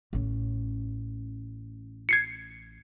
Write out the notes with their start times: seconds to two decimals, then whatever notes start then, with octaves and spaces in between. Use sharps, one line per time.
0.13 A1 C#4
2.09 G#6 C7 C#7